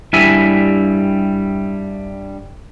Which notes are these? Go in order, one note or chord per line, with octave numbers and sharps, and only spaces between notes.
G2 G3 E4 E5 G#5